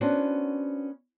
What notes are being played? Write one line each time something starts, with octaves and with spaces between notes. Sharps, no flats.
B3 C#4 D4 F#4 B4 C5